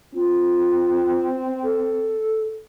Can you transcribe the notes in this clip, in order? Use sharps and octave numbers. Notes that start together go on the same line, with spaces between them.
C4 F4
A4